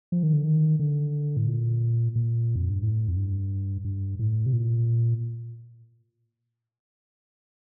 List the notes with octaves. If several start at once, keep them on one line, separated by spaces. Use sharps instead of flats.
F3
D#3
D3
D#3
D3
A2
A#2
A#2
F2
G2
A2
F2
G2
G2
A2
C3
A#2